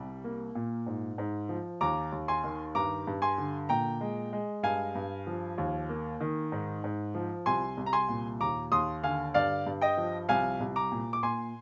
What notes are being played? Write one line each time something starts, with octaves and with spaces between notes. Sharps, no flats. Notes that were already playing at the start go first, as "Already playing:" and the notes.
Already playing: C2 G3
A#3
A#2
G#2
G#2
F3
D#2 A#5 D6
D#2
G#5 C6
D#3
G2 A#5 D6
G2
G#5 C6
D3
A#2 G5 A#5
G#3
G#3
G2 F5 G#5
G2
F3
D#2
A#3
D#3
G#2
G#2
F3
C2 G#5 C6
C2
A#5
G#5 C6
A#2
D#2 A#5 D6
D#2 C6 D#6
D3 F5 G#5
G2 D5 F5
G2
D#5 G5
F3
C2 F5 G#5
C2
A#5 D6
A#2
D6
A#2 G#5 C6